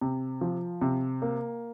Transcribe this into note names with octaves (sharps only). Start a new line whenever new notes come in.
C3
F3
C3
A#3